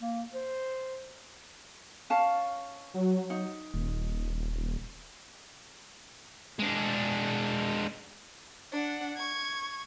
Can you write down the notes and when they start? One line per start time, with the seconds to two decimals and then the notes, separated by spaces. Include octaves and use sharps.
0.01 A#3
0.33 C5
2.10 C#4 F5 A5
2.94 F#3
3.30 D#4
3.74 D#1
6.59 G#3 D4
8.72 D4 F#5
9.17 C#6 G#6